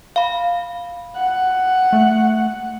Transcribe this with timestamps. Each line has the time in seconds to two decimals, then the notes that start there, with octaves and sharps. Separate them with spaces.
0.16 F5 B5
1.16 F#5
1.93 A3